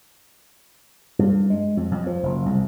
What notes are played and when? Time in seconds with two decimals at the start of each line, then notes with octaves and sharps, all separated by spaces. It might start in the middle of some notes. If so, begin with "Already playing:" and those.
1.19 G2
1.50 G#3
1.77 F2
1.91 F2
2.07 F3
2.23 F#1
2.46 C2